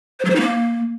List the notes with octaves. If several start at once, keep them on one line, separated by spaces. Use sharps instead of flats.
C5
F#3
C5
D#4
A#3